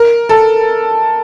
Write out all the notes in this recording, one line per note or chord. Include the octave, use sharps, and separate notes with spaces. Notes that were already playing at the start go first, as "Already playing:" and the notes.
Already playing: A#4
A4